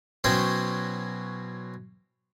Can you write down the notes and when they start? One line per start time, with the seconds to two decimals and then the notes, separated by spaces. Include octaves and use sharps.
0.24 B2 F#3 C#4 E4 C5 G5